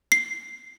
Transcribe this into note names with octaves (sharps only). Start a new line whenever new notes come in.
C7